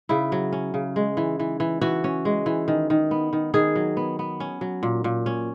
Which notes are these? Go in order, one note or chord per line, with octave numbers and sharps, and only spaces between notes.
C#3 E4
F#3
C#4
C#3
G#3
E3
E3
E3
E3 F#4
C#4
G#3
E3
D#3
D#3
B3
D#3
D#3 G#4
F#3
B3
B3
C#4
F#3
A#2
A#2
C#4